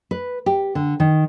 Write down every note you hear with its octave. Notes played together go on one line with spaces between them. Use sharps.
B4
G4
D3
D#3